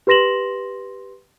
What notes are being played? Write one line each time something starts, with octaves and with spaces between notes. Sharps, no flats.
G4 B4 C6 A#6 E7 F#7